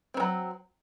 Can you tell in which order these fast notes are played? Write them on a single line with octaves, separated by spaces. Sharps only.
C4 D#3 F#3